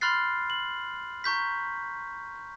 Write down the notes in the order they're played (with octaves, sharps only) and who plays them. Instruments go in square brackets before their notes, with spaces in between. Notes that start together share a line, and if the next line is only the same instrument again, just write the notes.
[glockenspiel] B5 C6 F6 F#6 A6 C7
F#7
A#5 C#6 G6 B6